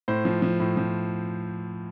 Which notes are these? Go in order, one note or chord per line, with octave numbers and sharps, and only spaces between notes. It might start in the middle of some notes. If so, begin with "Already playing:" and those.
A2 C5
F3
F3
A2
F3